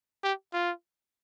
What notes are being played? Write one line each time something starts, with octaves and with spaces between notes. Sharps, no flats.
G4
F4